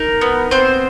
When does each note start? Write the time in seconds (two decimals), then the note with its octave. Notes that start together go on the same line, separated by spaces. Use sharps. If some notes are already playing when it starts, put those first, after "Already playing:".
Already playing: D#4 A#4
0.21 B3
0.51 B3 C4 C5